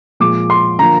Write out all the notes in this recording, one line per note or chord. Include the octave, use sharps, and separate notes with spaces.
A#2 F3 G#3 D6
C6
D3 F3 A#3 A#5